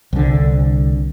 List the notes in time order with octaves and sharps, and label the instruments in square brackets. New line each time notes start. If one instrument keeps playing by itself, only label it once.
[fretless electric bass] C2 D3